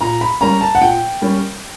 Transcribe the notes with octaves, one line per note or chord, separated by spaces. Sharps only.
A#2 A#5
B5
G3 A#3 C#4 A#5
A5
F#5
A#2 G5
G3 A#3 C#4